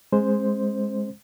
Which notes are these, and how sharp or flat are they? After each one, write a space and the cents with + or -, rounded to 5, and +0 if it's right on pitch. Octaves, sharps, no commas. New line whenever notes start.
G#3 +0 C4 +45 C5 +0